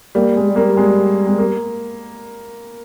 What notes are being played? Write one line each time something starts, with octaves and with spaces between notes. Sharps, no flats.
G3 A#3
G#3
G3
A#3
G#3
G#3
A#3